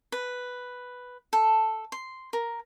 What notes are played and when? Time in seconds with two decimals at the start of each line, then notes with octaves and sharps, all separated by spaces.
0.12 B4
1.33 A4
1.92 C6
2.33 A#4